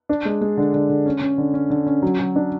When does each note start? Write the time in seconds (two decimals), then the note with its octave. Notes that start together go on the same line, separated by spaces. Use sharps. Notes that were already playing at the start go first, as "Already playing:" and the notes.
0.09 D4
0.25 G#3
0.41 G#3
0.57 D3
0.74 D3
0.89 D3
1.06 C#4
1.21 C#4
1.38 D3
1.54 C#4
1.70 D3
1.86 C#4
2.02 F#3
2.19 F#3
2.36 D4